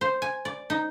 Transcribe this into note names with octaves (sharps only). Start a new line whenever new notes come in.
C5
G#5
D5
D#4